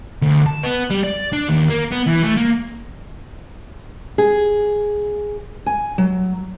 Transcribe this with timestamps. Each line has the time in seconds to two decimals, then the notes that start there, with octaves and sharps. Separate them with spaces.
0.22 D2
0.46 A5
0.63 B3
0.90 G3
1.03 D5
1.33 D4
1.48 D#2
1.69 A#3
1.91 B3
2.06 E3
2.23 A3
2.37 A#3
4.18 G#4
5.66 G#5
5.98 F#3